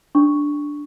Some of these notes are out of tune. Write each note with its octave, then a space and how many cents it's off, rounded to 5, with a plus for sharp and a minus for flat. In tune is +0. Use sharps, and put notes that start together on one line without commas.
D4 +0 C#6 +0